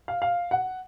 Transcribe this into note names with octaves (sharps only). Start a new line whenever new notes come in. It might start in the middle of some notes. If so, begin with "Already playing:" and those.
F5
F5
F#5